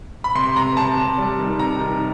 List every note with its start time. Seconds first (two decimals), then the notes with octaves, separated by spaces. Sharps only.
0.24 B5
0.35 C3 C6
0.56 C3 A#5
0.77 C3 A5
0.97 C3
1.18 G3
1.39 D#3
1.59 C3 A#5
1.80 D#3